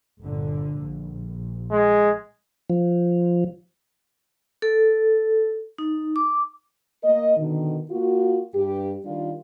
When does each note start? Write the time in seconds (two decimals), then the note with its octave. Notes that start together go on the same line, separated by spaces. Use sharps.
0.20 G1 A#2 D3
0.80 A#1
1.71 G#3
2.70 F3
4.62 A4
5.78 D#4
6.16 D6
7.03 A#3 A#4 D#5
7.37 B2 D3 D#3
7.90 A#3 F4 F#4
8.55 G2 G4
9.05 D#3 G3 D4 F4